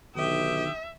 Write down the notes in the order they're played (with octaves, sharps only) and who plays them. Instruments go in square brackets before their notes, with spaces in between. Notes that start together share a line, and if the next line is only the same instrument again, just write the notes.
[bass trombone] B1 [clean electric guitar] D3 D#3 [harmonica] G4 G5 D#6 [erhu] E5